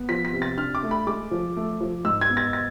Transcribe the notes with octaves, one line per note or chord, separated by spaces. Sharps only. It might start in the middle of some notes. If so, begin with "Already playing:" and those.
Already playing: B3
F3 B6
B6
C3
A6
D4 F6
D6
A3
B5
G#3 D6
F3
A3
F3
G#2 E6
G#6
B3
A6
A6